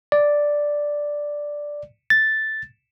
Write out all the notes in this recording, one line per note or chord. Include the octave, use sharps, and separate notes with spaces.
D5
A6